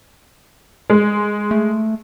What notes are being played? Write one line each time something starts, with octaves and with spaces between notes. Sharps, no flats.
G#3
A3